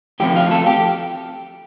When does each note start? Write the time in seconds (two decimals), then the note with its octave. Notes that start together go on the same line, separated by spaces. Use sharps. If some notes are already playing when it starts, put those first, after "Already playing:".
0.20 A2 F3 A3 C4 G4 G5
0.35 F4 F5
0.51 A4 A5
0.66 G4 G5